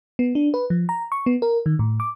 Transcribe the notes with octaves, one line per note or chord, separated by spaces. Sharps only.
B3
D4
B4
F3
A#5
C#6
B3
A#4
D#3
A2
D6